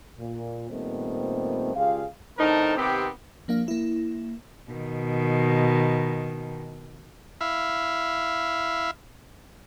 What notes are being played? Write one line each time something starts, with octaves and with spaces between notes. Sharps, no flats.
A#2
A#2 D#3 G3 A3 B3 C4
C#2 F4 G4 G#4 D5 F5
A2 D3 C4 D#4 A#4 A5
C3 D#3 B3 C4 G4
F3 A#3 D4 F5
A#3 E4
B2 D#3
E4 E5 F5